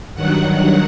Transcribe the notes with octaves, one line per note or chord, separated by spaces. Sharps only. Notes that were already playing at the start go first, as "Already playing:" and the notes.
G2 D#3 F#3 F#5